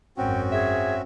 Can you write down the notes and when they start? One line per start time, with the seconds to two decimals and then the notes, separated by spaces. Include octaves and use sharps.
0.17 G#1 F#2 C4 C#4 F#4 G5
0.52 G#4 E5